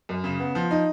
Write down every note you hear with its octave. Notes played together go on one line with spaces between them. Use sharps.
F#2
C#3
B3
F3
D#4